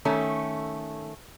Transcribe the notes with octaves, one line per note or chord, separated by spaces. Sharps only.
D#3 A3 C#4 A4